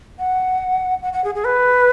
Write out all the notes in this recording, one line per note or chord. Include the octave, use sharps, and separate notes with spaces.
F#5
F#5
F#5
G#4
G#4
B4